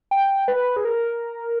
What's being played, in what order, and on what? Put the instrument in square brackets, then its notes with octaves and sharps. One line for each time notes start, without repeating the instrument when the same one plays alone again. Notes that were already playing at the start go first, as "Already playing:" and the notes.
[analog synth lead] G5
B4
G#4
A#4